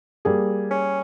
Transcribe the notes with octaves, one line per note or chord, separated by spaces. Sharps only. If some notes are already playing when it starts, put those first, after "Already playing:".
G3 A#3 G#4
C#4